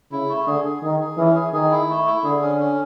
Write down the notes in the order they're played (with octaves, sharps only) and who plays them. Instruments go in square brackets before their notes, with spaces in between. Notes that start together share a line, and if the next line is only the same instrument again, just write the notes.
[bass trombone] C#3 [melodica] E4
[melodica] A3
[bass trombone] D3 [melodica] G#4
[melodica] G#4
[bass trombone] D#3 [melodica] G#4
[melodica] G#4
[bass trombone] E3 [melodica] C#4
[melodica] G#4
[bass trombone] D#3 [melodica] G#4
[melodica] E4
A3
E4
[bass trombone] D3 [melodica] G#4
[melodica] C#4
C#4